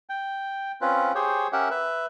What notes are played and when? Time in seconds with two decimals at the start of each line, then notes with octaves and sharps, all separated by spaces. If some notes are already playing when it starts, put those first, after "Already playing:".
0.09 G5
0.81 C4 C#4 F4 B4
1.15 G4 G#4 C5 C#5
1.53 C#4 G4 A#4 E5 F#5
1.70 B4 E5